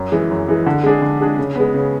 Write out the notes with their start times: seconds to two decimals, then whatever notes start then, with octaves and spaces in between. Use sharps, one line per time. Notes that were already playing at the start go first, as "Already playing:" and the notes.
Already playing: F#2
0.12 E3 G#3
0.31 F#2
0.48 E3 G#3
0.66 D3
0.83 G#3 D4 G#4
1.02 D3
1.21 G#3 D4 G#4
1.39 C#3
1.56 G#3 B3
1.74 C#3